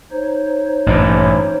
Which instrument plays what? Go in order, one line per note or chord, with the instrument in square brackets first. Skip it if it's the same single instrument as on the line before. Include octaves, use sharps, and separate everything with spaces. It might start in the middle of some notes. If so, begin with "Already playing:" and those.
[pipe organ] D#4 C5 C#5
[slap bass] A1 G2 A#2